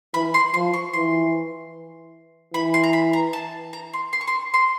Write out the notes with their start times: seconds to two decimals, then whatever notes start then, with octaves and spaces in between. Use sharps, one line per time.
0.14 E3 B5
0.34 C6
0.54 F3 C6
0.74 C#6
0.93 E3 C6
2.54 E3 B5
2.74 C6
2.83 A#5
2.93 B5
3.13 A#5
3.33 A5
3.73 A#5
3.93 C6
4.13 C6
4.21 C#6
4.27 C6
4.54 C6